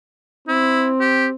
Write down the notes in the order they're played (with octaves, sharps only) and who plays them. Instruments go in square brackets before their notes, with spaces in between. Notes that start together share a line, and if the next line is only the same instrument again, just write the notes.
[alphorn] C4 [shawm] E4
[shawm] G4